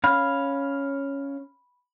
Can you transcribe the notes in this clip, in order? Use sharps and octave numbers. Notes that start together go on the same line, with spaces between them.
C#4 F5 B5